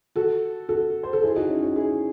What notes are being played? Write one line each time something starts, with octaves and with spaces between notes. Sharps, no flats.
F#4 A4
F#4 A4
C5
A4
E4 G#4
D#4 F#4
C#4 E4
D#4 F#4
E4 G#4